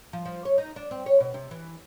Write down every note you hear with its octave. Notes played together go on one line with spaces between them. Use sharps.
F3
F3
C#5
D#4
D4
C4
C#5
B2
C3
E3